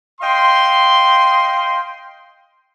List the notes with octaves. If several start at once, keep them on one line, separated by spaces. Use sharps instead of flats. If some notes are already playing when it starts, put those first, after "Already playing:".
D#5 F5 G5 C6